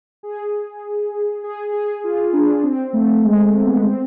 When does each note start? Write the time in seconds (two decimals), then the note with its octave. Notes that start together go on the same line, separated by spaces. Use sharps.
0.23 G#4
1.44 G#4
1.73 G#4
2.04 F4
2.33 D4
2.63 C4
2.93 A3
3.24 G#3
3.44 A3
3.64 B3
3.85 C4